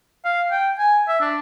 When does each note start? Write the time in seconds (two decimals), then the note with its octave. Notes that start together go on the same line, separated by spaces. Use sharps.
0.25 F5
0.51 G5
0.78 G#5
1.08 E5
1.21 D4